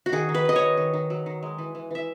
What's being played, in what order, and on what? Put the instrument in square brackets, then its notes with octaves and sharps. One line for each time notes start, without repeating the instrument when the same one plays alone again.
[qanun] F#4
D#3 G#4
D#3
B4
D#3 D#5
C#5
D#3
D#3
D#3
F#3
D#3
G#3
E3
E3
E3 E5